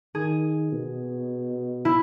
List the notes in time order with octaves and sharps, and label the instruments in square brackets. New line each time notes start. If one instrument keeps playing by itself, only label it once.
[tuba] D#3 [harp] G#4
[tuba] B2
[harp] E4